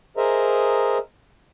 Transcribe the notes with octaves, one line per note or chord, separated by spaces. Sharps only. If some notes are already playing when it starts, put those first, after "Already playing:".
G#4 A#4 C5 D#5 E5 A#5